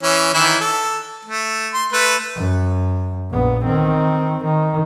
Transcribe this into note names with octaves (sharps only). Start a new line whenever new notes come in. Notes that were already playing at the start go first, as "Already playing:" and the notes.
E3 C#4
D#3 E3 E4
A4
A3
C6
A3 B4
F#2
A#1 B3
D#3 C4
D#3